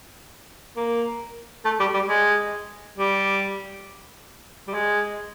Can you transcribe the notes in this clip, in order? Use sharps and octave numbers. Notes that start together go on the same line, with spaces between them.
A#3
A3
G3
G3
G#3
G3
G3
G#3